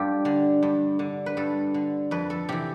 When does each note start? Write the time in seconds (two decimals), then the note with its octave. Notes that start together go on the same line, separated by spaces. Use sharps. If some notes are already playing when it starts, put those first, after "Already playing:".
Already playing: G2 F4 G4 A4
0.25 D3
0.63 G2
0.99 D3
1.26 B4
1.37 G2 A4
1.74 D3
2.11 F2 B4
2.30 A4
2.49 C3 E3 G4